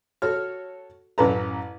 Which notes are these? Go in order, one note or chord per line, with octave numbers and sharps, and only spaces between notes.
F#4 A4 C#5 F6
A1 F#2 B4 A5 A#5